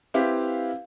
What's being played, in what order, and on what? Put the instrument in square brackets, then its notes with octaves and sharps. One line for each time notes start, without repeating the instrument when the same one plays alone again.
[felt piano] C4 E4 G4 B4 F5